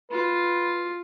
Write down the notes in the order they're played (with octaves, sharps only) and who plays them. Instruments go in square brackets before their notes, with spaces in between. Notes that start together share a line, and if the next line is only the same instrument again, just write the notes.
[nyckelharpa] F4 [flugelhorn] B4